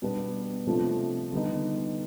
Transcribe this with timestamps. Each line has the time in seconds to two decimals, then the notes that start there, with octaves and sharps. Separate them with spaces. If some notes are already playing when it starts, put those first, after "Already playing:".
0.02 B2 G3 B3 D4
0.67 C3 F3 A3 D4
1.32 D3 G3 B3 D#4